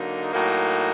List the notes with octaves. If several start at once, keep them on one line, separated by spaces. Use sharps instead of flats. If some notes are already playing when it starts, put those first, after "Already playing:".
Already playing: D3 F#3 A#3 D#4
A2 F#3 A#3 D#4 F#4